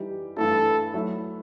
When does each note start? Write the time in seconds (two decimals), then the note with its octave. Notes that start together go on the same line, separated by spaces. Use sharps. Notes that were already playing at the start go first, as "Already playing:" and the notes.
Already playing: E3 G3 D#4 G4
0.37 G2 E3 A3 E4 A4
0.94 F#3 A3 E4